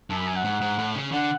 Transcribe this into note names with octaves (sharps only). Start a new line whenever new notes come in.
F#2 A5
B5
G#5
F#5
G#2
G#2
A2
C#3
D3 F#5